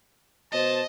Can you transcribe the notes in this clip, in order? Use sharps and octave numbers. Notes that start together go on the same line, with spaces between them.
B2 C5 D#5 A5